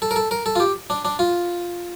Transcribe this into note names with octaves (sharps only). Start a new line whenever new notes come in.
A4
A#4
A4
A#4
A4
F4
G4
D4
D4
F4